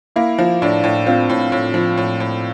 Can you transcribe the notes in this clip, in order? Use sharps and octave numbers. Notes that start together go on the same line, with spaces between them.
A#3 E4
F3
A2 D4
A2
C4 F4
A2
A2
F3
A2
A2